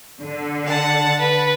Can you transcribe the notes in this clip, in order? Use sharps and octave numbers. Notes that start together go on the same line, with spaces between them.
D3
F#5 A5
B4